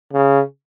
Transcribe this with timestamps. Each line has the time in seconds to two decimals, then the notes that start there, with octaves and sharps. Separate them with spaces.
0.13 C#3